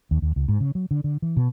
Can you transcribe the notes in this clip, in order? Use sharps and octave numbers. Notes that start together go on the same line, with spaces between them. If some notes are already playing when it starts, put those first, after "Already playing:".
D#2
D#2
C#2
G#2
C#3
F#3
D3
D3
E3
B2